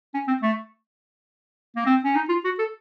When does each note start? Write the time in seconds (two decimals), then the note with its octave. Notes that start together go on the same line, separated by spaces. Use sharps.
0.14 C#4
0.27 C4
0.42 A3
1.76 A#3
1.86 C4
2.04 C#4
2.15 D#4
2.29 F4
2.44 F#4
2.58 A4